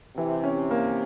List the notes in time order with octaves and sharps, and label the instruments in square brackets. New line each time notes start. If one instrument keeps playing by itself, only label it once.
[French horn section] C3 [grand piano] E3
[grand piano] C#4
A#3